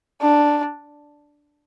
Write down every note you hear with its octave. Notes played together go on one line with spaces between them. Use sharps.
D4